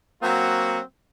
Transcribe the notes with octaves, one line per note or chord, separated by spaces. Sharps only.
F#3 A#3 C4 F#4